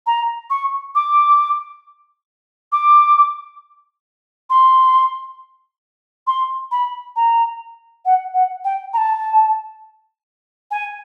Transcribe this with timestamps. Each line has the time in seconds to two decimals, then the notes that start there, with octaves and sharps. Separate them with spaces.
0.06 A#5
0.50 C#6
0.95 D6
2.72 D6
4.50 C6
6.27 C6
6.71 B5
7.16 A#5
8.05 F#5
8.34 F#5
8.64 G5
8.93 A#5
8.97 A5
10.71 G#5